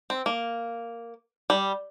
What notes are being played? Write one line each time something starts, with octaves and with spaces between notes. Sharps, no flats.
C4
A#3
G3